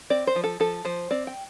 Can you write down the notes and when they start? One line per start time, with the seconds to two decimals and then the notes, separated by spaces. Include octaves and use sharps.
0.10 C4 D5
0.27 C5
0.36 F3
0.44 A4
0.60 F3 A4
0.85 F3 C5
1.11 C4 D5
1.27 G5